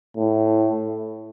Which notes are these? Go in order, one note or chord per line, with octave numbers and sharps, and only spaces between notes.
A2